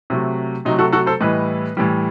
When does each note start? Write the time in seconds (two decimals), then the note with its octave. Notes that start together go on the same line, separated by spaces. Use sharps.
0.10 C3 F#3 A3
0.65 C3 F#3 A3 D#4
0.79 F#4 A4
0.92 F#4 A4
1.06 A4 C5
1.21 A2 E3 G3 B4 D#5
1.77 A2 E3 G3